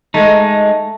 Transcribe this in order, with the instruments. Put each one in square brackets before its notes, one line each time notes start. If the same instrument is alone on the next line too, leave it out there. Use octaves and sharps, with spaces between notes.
[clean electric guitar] G#3 D#4 [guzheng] A3